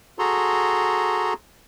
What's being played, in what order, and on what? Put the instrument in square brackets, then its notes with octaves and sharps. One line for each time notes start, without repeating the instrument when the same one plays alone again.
[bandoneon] F#4 G#4 A4 A#5 C6